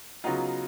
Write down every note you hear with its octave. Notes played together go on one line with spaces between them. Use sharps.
C#3 F#3 B3 D#4 F4